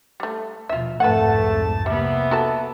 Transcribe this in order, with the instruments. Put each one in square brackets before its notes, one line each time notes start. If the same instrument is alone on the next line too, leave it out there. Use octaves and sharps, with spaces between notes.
[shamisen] G3 A3
[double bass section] D#2 B2 F3 [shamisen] F4 E5
[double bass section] C2 F2 G#2 [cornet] A3 [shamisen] B4 F#5 [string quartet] A5
[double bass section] C3 [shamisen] G3 [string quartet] A#3 B3 [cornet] E5
[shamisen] F#4 A4 A5